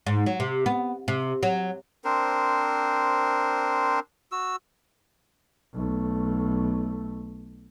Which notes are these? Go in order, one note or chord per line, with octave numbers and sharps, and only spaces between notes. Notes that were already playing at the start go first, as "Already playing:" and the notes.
G#2
F#3
C3
B3
C3
F#3
C4 D4 A#4 C5
F#4 E6
B1 A3